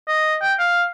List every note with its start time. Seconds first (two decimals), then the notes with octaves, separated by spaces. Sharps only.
0.08 D#5
0.42 G5
0.59 F5